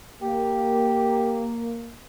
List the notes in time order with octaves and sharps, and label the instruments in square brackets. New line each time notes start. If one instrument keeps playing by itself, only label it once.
[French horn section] A#3 [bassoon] G4